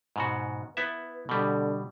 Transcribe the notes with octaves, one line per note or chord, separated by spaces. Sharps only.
G#2 B2 F#4
B3 E4 B4 E5
B2 D3 G3